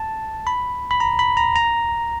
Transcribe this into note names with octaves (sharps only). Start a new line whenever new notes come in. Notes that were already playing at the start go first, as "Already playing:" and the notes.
Already playing: A5
B5
B5
A#5
B5
A#5
A#5